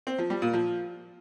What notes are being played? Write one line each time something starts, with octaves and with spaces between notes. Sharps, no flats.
C4
F3
G3
A#2
F3